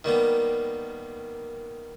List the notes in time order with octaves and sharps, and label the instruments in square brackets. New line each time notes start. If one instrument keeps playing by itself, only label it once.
[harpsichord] D#3 G3 A#3 B3